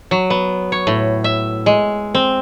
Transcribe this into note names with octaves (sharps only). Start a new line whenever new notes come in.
F#3
B3
C#5
A2
E5
G#3
C4